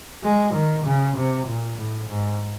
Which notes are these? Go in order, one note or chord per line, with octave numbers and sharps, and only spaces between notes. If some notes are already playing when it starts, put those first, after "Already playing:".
G#3
D#3
C#3
C3
A#2
A2
G#2